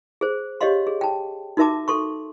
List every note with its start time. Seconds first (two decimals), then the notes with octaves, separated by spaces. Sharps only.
0.21 G#4 C5
0.61 G4 C#5 D#5 F5 C6
0.87 G#4
1.01 G5 A5
1.57 D#4 F#4 A#4 E5 A5 D6
1.88 A4 C6 C#6